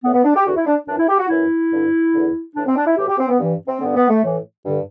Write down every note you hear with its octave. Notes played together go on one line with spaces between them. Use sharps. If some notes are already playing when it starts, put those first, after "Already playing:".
A2 E3 B3
B3
D4
G4
E2 D3 F#4
E4
D4
F#2 E3 D4
E4
G4
F#4
F#2 E3 E4
G2 D3
E2 D3
A2 E3 D4
C4
D4
E4
A2 E3 G4
G4
C4
B3
G2 E3
C4
G2 D3 B3
B3
A3
A2 E3
G2 D3